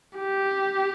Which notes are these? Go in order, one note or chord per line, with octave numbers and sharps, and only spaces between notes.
G4